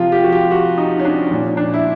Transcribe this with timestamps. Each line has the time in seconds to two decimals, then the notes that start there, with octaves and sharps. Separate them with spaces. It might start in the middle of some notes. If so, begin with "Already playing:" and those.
Already playing: C3 F3 F4
0.12 G4
0.24 F#4
0.32 G4
0.51 F#4
0.78 D#4
1.00 C#4
1.05 D4
1.31 A#2 F3
1.57 D4
1.74 E4